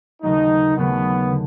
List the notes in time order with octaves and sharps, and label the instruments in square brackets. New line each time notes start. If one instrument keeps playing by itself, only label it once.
[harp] D#2 C#3 F#3 A3 [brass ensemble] D#4
[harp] D#2 C#3 F#3 A3 [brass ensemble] B3
[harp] D3